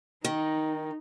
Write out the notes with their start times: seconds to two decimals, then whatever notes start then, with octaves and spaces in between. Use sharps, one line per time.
0.25 D#3 D#4